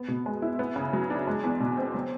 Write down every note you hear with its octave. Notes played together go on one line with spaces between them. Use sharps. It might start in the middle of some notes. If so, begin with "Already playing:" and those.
Already playing: B3
B2
G#3
E4
B3
C#3
F#3
D4
G#3
E2
B2
C4
F#3